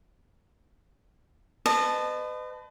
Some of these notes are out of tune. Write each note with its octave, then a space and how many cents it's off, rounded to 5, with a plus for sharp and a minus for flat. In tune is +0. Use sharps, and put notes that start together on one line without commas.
B4 +40 D#5 -30 A5 -5